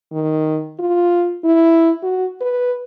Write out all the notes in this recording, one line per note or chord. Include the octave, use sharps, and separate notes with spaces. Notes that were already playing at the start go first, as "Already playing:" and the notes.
D#3
F4
E4
F#4
B4